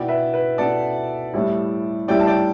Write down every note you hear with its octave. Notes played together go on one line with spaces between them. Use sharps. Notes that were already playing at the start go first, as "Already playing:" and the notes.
Already playing: B2 B3 E4 D5 G5
B4 E5
B4
B2 B3 E4 A4 D5
A2 G3 E4
A2 G3 E4 D5 G5
A5
D5 G5